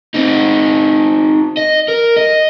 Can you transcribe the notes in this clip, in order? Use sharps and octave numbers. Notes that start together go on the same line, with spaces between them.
C4 D#4
D#5
A#4
D#5